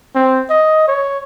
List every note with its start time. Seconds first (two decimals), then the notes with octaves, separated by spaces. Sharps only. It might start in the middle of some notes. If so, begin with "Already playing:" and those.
0.15 C4
0.50 D#5
0.88 C#5